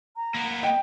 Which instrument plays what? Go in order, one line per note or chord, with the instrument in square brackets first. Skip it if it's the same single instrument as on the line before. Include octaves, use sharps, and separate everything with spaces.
[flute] A#5
[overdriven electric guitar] A#3 B3
[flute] D#5 [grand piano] G5